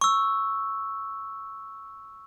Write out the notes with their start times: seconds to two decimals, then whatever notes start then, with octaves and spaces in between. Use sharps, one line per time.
0.01 C#6 E6